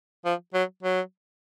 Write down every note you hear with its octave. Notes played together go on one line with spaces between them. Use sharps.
F3
F#3
F#3